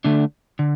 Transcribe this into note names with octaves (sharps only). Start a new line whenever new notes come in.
D3 A3 D4
D3